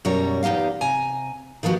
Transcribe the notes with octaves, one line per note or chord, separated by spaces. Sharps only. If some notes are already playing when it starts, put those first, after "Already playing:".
F#2 B2 G3 A#4 C#5 A#5
E2 B3 D#4 G4 F5
C3 G#5 A#5
D#3 F3 B3 F#4 G4